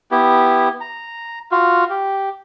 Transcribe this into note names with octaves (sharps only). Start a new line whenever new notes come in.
B3 E4 G4
A#5
F4 F#4
G4